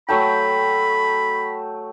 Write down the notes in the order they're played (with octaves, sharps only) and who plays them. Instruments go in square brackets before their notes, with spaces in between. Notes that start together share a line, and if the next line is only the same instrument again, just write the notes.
[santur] F#3 A3 G5 [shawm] B5